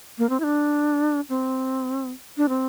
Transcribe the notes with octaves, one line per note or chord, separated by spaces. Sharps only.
A#3
C4
E4
D4
C4
D4
C4